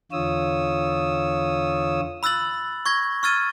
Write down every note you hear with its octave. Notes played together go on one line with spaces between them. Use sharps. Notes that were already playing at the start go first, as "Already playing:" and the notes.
E2 D3 F4 C#5 D#6 E6
B5 E6 F#6 A6 F#7
C#6 G#6 A#6
C#6 E6 F6 G#6 A6 D#7